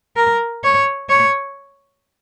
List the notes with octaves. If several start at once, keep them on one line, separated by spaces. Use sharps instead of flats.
A#4
C#5
C#5